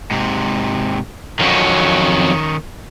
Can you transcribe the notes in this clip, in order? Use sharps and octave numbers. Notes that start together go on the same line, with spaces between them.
G#2 C3
F2 D#3 F#3 C#4